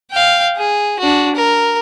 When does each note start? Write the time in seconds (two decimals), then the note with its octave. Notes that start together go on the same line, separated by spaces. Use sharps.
0.11 F5 G5
0.56 G#4
0.99 D4 F#4
1.35 A#4